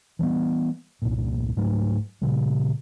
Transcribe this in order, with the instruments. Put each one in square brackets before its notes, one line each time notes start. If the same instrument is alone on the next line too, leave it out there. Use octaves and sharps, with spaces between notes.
[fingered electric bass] E3 G3 G#3 B3
G1 C2 A#2
G#2 F#3 A3
A#2 C#3 G3